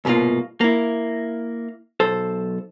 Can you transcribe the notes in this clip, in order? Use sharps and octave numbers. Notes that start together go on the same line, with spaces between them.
C2 G#2 B2 A#3 F4
A#3 E4
B1 A4 C5